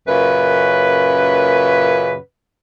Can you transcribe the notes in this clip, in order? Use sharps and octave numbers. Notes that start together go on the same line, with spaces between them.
F#2 A#2 C#3 B4